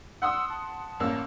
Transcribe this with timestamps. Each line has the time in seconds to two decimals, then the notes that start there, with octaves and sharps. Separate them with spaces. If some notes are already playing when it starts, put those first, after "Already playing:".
0.22 F#5 C6 D#6 E6
0.50 A5
1.00 A1 A#3 E6